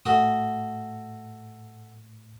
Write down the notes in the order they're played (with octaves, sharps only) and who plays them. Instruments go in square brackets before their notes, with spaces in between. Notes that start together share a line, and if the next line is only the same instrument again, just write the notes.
[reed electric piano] A2 [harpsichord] A3 F#4 D#6